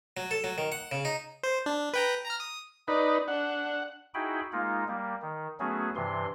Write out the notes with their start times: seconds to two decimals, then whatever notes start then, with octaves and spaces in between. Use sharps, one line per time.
0.17 F#3
0.31 A4
0.44 F#3
0.58 D#3
0.72 F#5
0.92 C#3
1.05 D#4
1.43 C5
1.66 D4
1.93 B4 G5 A#5
2.26 A#5 F6
2.40 D#6
2.88 D#4 B4 D5
3.28 D4 F#5
4.14 D#4 E4 F#4 G#4 G5 B5
4.52 G#3 A#3 D#4 F4
4.88 G3 A#3
5.22 D#3
5.60 F#3 A3 B3 C#4 F#4 G#4
5.96 G2 C3 E3 C6